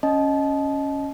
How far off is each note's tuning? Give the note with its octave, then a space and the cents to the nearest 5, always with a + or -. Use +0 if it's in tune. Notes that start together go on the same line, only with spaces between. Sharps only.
C#4 +0 D#5 +0 A5 -30